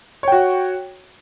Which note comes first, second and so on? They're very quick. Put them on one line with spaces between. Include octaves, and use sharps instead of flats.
C#5 G5 F#4